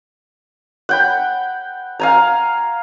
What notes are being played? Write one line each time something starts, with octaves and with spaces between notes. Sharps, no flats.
F#5 G5 B5
F5 G#5 A#5